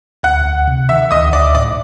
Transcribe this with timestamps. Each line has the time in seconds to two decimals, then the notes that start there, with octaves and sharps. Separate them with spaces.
0.23 D2 F#5 F#6
0.45 D2
0.68 C3
0.89 D#3 E5 E6
1.11 D2 D#5 D#6
1.33 D2 D5 D6
1.55 A2 D5 D6